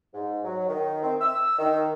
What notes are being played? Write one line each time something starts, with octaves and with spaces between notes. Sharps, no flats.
G#2
F#3
D#3
C4
E6
D#3